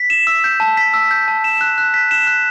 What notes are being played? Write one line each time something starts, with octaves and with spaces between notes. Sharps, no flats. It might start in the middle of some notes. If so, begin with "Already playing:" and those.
Already playing: B6
E7
E6
G6
A5
B6
E6
G6
A5
E7
F#6
F#6
B6
E7
F#6